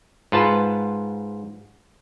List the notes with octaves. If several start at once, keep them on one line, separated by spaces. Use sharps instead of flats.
G#2 F4 B4 A5